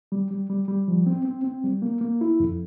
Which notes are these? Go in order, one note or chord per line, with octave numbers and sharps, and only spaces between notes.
G3
G3
G3
G3
F3
C4
C4
C4
G3
A#3
A#3
E4
F2